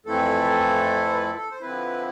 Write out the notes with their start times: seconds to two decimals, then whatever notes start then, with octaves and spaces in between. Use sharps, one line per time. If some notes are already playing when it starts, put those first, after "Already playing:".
0.06 F2 E3 A3 C4 E4 A4
1.05 C5
1.13 B4
1.22 A4
1.35 A4
1.51 C5
1.61 D3 F3 C4 E4 B4